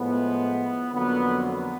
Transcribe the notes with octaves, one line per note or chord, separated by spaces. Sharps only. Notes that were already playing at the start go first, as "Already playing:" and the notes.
Already playing: A2 F3 G#3 B3
F2 D3 F#3 A#3 B3
B3